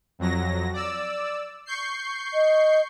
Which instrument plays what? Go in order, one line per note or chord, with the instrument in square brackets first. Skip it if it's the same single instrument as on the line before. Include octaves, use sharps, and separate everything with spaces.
[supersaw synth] F2 F#3 A#6
D5 E6
C#6 G6 C7
[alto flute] D#5